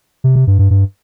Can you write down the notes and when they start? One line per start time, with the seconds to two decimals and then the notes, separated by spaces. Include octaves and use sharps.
0.24 C3
0.36 C3
0.47 G2
0.59 G2
0.71 G2